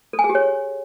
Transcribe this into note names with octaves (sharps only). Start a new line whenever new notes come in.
A4
G#5
G#4
G4
C#5